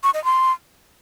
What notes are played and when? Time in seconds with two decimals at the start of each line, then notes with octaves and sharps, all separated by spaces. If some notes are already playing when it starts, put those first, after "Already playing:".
0.03 C#6
0.14 D#5
0.24 C6